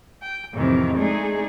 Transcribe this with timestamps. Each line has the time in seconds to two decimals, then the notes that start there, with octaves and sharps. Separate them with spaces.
0.21 G5
0.53 F2 A2 C3 D#3 E3
0.96 G#3 A3 D4 D#4 G#4